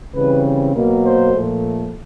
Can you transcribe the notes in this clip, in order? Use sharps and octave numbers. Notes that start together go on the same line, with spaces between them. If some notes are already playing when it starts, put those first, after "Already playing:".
C#3 E3 G3 C4 B4
B2 F#3 A#3
C5
A#2 F3 A3